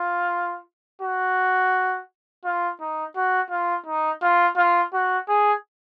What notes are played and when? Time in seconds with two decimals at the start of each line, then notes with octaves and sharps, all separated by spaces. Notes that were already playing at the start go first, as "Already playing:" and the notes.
Already playing: F4
1.02 F#4
2.45 F4
2.80 D#4
3.16 F#4
3.51 F4
3.86 D#4
4.22 F4
4.57 F4
4.93 F#4
5.29 G#4